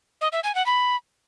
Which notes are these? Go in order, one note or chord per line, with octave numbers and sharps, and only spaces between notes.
D#5
E5
G#5
F#5
B5